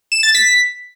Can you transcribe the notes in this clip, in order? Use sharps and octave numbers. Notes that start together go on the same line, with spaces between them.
E7
A6
B6